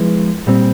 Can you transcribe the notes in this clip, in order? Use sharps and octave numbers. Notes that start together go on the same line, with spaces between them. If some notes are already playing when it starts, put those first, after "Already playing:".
Already playing: F3 G#3 B3 E4
A#2 G3 C4